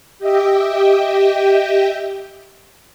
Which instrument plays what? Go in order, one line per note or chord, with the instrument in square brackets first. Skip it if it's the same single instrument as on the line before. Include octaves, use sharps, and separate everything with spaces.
[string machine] G4 D#5 E5 G5